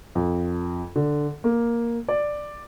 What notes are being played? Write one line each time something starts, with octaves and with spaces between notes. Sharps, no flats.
F2
D3
A#3
D5